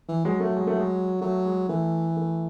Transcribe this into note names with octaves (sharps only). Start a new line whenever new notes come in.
E3
F#3 G#3
A3
G#3
A3
G#3
F#3 A3
G#3
E3 A3
A3